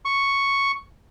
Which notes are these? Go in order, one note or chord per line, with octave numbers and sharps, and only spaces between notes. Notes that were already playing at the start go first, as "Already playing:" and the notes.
C#6